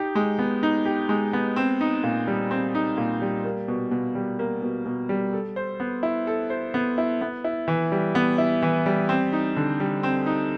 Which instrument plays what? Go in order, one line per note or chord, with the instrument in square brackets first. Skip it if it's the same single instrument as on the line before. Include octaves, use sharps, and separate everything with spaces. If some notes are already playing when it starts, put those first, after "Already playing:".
Already playing: [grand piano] D#4 G4
G#3
B3
D#4
G4
G#3
B3
C4
D#4
A#2
G3
C4
D#4
A#2
G3
A#3
B2
B2
G3
A#3
B2
B2
G3
A4
C5
B3
E4
A4
C5
B3
E4
B3
E4
E3
G3
B3
E4
E3
G3
C4
D#4
D3
G3
C4
D#4